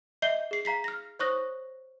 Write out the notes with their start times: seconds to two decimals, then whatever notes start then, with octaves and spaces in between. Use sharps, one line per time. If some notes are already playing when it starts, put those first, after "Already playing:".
0.22 D#5 E5 G6 C7 G7
0.51 G#4 C7
0.65 F5 A#5 B6 C7
0.84 F6 A#6
1.19 C5 C#5 C#6 D#6 F#6 A#6